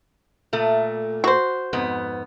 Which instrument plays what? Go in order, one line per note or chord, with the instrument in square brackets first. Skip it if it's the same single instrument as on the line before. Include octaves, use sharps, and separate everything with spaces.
[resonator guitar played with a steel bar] A#2 A3
[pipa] F#4 C5
[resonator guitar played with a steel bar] F2 G#2 B3